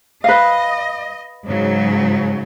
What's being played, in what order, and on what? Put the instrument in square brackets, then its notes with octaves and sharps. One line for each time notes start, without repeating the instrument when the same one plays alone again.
[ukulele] B4 F5 [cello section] D#5
[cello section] G#2 C#3 F#3